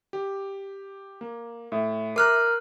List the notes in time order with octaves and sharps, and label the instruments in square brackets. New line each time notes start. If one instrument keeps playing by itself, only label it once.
[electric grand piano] G4
A#3
[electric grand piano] A2 [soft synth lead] E5
[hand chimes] A#4 F6 F#6 [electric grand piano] A#5 D6